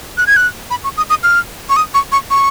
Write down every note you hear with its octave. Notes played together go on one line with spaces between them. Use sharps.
F#6
G#6
F#6
B5
C#6
D#6
D#6
F6
C#6
D#6
C#6
C#6
C#6